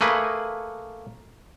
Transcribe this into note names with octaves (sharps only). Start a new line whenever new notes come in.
A3 A#3 G#4 B4